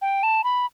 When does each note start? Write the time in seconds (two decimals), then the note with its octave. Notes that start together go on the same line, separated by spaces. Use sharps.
0.02 G5
0.23 A5
0.44 B5